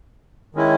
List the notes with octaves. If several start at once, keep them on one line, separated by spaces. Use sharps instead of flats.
D#3 G#3 C#4 E4